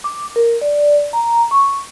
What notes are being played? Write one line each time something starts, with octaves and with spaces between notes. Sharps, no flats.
D6
A#4
D5
A#5
C#6